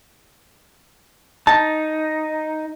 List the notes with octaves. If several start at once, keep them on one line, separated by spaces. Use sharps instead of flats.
D#4 A5